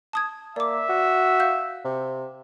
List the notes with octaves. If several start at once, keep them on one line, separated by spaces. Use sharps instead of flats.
A5 D#6 G#6
A#3 D5 E5 D6
F#4
F5 G6
C3